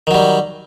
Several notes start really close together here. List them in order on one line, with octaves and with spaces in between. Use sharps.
D#3 F#3 G3